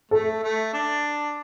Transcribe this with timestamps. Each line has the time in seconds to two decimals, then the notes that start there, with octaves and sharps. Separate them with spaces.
0.11 A3 A4
0.43 A3
0.74 D4